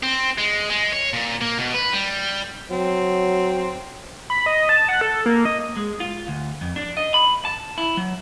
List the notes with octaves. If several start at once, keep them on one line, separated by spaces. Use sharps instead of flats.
C4
G#3
G#3
C#5
A#2
A#3
B2
B4
G3
F#3 C4
B5
D#5
A5
F#5
A4
A#3
D#5
G#3
F4
D2
F2
D4
D#5
B5
A5
E4
F#3